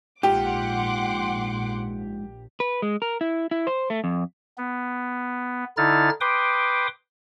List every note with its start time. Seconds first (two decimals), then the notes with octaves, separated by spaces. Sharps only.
0.23 A#1 G#2 F4 G4 F#5 G5 C6 D6
2.60 B4
2.82 G#3
3.02 A#4
3.21 E4
3.51 E4
3.67 C5
3.90 A3
4.04 F2
4.58 B3
5.77 D3 D#4 E4 F6 A6
6.21 B4 G5 C6 D6 D#6